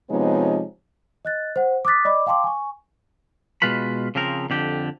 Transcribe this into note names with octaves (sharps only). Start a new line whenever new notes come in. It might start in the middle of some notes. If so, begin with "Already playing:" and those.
C3 F3 G#3 B3 D#4 C#5
D#5 F#6 A6
C5 F#5
D6 D#6 F#6 A6 B6
D5 D#5 B5 D6
F5 G5 A5 C6 D6
G#5 C#6
B2 G#3 F4 B4 B5
C#3 F3 C4 A#4
F2 D3 G4